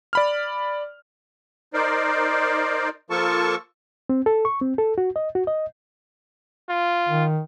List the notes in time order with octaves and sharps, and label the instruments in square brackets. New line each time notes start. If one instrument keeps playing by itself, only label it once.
[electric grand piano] D5 B5 F6
[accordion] D#4 A#4 C5 D5
F3 A#3 F4 A4 A5 C#6
[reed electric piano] C4
A4
C#6
C4
A4
F#4
D#5
F#4
D#5
[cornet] F4
[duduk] D#3